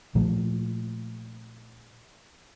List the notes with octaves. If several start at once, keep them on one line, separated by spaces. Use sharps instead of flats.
A#2 F3 A3